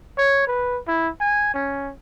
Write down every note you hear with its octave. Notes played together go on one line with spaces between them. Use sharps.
C#5
B4
E4
G#5
C#4